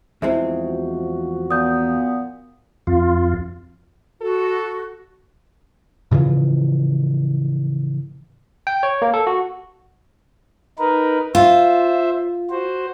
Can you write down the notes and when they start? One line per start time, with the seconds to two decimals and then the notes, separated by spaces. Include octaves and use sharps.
0.22 E2 F3 G#3 C4 E4 F#4 E5
1.51 A#2 B3 D#6 G6
2.87 F2 F4
4.21 F#4 A4
6.11 A2 C#3 E3 F3
8.67 G5
8.83 C#5
9.02 A#3
9.14 A4
9.27 F#4
10.79 D#4 A#4 B4
11.35 F4 C5 E5
12.50 F#4 C5